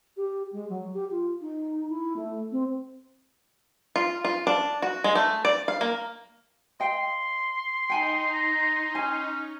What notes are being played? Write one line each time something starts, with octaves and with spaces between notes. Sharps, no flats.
G4
G#3
F#3
G4
F4
D#4
E4
A3
C4
F4
F4
D4
F#4
G#3
A3
D5
F5
A#3
D#5 F5 G5 C6
D#4 G5 G#5 B5
A#5
C#4 G#5